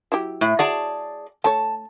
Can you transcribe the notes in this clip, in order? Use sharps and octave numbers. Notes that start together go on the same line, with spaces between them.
F#3 E4 G4
A2
F#4 G#4 D5 A5
A3 A4 C#5 A5